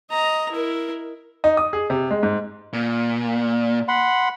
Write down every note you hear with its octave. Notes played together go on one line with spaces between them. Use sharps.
D#5 A#5
E4 A#4
D#4
D#6
G#4
C3
G#3
G#2
A#2
F#5 B5 C6